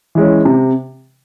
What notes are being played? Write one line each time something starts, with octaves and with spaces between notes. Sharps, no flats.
E3 G#3 C#4
C3